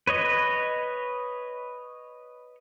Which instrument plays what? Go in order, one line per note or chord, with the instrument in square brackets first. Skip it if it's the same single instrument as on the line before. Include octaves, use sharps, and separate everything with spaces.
[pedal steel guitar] B4 C#5 D#5